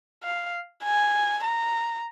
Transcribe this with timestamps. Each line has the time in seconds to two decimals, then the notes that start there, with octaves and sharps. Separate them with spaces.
0.23 F5
0.84 G#5
1.44 A#5